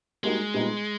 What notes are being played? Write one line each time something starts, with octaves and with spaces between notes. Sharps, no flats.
G3 G#3 A#3 D#4 F#4
A#2 G3 B3 D#4